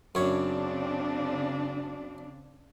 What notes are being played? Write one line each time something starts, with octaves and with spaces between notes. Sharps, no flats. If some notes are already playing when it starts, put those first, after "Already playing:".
F#2 C#3 C4 D4 C#5